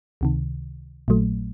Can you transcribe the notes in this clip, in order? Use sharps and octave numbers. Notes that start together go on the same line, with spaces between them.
C#2 C3 D#3
A#1 A#2 F#3 A3